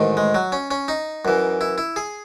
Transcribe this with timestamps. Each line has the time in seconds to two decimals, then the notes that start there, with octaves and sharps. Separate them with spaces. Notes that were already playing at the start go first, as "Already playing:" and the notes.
Already playing: A1 G#2 D#3
0.17 G#3
0.35 F#3
0.52 C#4
0.71 C#4
0.88 D#4
1.25 F#2 E3
1.61 E4
1.78 E4
1.96 G#4